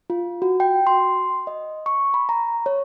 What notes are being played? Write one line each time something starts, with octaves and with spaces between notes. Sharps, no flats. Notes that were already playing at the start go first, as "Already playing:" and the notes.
F4
F#4
G5
C6
D#5
C#6
B5
A#5
C#5